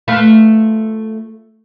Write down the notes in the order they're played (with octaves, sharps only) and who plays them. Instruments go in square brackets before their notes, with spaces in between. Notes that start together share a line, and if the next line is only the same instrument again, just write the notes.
[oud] A3 F4 B4